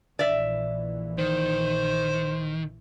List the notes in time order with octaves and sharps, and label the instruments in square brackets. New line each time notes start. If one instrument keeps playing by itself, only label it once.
[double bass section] A#1 E3 [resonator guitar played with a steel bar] D5 E5
[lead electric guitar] D#3 [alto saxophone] C5